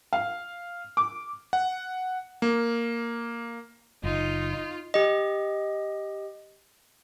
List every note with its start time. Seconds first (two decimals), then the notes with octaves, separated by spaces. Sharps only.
0.13 F5
0.97 D6
1.53 F#5
2.42 A#3
4.04 F#1 D#4 F4
4.94 G4 D#5